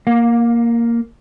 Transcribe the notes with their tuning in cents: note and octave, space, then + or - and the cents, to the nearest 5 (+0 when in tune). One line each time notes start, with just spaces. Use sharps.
A#3 +0 F5 +35